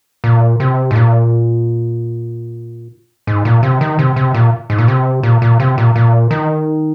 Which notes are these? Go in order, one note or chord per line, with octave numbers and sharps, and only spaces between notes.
A#2
C3
G#2
A#2
G#2
A#2
C3
D#3
C3
C3
A#2
G#2
A#2
C3
A#2
A#2
C3
A#2
A#2
D#3